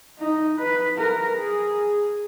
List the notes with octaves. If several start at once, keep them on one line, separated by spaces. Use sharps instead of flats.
D#4
B4
A#4
G#4